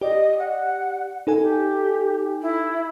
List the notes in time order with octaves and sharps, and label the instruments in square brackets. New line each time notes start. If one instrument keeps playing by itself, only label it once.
[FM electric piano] G4 D5 [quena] D#5
[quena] F#5
[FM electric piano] D#4 A4 G#5
[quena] G4
E4